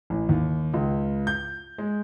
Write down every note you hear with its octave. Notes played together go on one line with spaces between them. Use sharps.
A1
D#2
C#2
G6
G#3